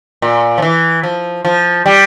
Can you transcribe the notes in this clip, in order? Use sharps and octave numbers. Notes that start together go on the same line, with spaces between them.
A#2
F3
E3
F3
F3
G3